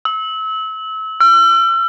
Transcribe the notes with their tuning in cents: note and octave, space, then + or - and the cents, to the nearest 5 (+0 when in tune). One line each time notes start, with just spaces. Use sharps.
E6 -30
E6 +45